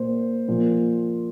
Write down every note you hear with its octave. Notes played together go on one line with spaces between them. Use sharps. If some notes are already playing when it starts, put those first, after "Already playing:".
Already playing: A#2 A#3 C5
A#2 F3 A#3